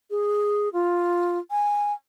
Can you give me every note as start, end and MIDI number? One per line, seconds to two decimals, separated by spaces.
0.10 0.68 68
0.73 1.38 65
1.50 1.92 80